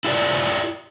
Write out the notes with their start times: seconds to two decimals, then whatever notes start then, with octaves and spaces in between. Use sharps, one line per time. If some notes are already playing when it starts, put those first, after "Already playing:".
0.05 E4 F4 G4 A#4 D5